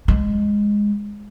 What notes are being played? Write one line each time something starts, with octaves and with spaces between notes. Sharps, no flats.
G#3